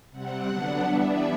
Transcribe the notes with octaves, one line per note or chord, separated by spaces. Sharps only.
C3 G3 C4 F#5
D3 F#3 B3 D4
E3 G3 B3 D4 E5